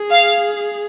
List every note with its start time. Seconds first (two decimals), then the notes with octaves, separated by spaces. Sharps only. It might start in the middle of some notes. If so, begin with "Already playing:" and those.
Already playing: G#4
0.10 F5